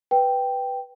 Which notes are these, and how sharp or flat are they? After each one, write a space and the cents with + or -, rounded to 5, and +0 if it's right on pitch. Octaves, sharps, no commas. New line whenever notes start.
B4 +0 G5 +0